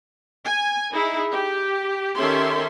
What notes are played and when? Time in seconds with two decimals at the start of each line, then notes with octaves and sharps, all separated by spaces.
0.45 G#5
0.92 D#4 E4 G#4
1.31 G4
2.17 D#3 C#4 G4 A4 E5 C6